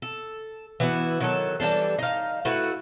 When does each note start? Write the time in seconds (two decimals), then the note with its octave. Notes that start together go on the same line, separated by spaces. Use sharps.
0.02 A4
0.80 E3 B3 E4 F#4
1.20 D#3 F#3 A4
1.60 E3 G3 D4 A4
1.99 D#4 F5
2.45 A3 E4 F#4 B4